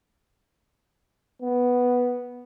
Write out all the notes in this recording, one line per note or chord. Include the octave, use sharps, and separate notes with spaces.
B3